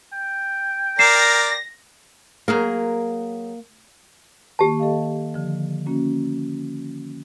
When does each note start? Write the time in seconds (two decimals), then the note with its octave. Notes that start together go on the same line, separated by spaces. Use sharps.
0.13 G5
0.99 A#4 D5 A#6 C7 E7
2.48 F#3 A#3 G#4 A#4
4.59 D#3 A#3 G4 A5
4.79 A4 D#5 F5
5.34 D3 F3
5.86 A#3 C#4 F#4